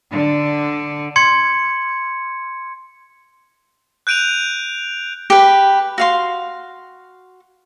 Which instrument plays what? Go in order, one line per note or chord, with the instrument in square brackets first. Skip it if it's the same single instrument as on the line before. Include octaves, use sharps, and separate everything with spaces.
[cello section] D3
[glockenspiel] C6 G#6 C#7
[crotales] F#6 G6 D7 D#7 F7
[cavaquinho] G4 B4
F#4 F5 C6